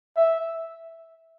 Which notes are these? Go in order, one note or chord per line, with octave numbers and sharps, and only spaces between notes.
E5